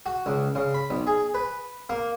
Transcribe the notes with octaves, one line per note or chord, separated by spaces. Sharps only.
F#4
C#2
C#3
B5
B1
G#4
B4
A#3